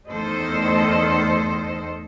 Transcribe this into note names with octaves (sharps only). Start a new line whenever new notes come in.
E2 D#3 A3 A4 C5 D#5